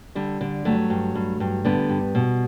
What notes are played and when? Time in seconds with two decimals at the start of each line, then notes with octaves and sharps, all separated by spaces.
0.15 D3 G3
0.41 D3
0.65 G2 F#3 A3
0.90 G2
1.15 G2
1.40 G2
1.65 D3 G3 B3
1.90 G2
2.15 B2